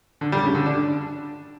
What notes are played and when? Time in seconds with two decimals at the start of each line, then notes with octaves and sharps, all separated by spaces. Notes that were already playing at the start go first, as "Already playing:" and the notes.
0.21 D3
0.32 G3
0.43 C#3
0.55 D3
0.66 D4